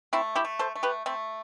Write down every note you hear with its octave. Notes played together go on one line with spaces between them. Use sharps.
A3 C4 E4
E4 G4
A3
A4 C5
A3
G4 B4
A3 C4